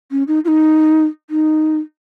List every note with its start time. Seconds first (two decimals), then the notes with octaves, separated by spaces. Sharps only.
0.11 C#4
0.28 D#4
0.45 F4
0.48 D#4
1.30 D#4